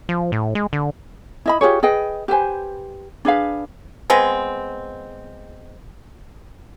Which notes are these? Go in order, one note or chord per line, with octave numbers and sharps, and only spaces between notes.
F3
A2
G#3
D3
E4 D#5 B5
F4 G4 G#4 C#5
G#4 B4 D#5 G5
G4 B4 C5 G#5
D4 G#4 B4 F5
G#3 B3 C4